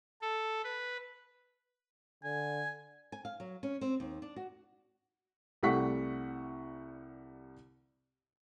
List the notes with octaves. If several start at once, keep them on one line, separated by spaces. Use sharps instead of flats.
A4
B4
D3 G#5
G#5
F5
F#3
C#4
C4
D#2
D4
F#4
C2 G3 A3 F#5 C#6 B6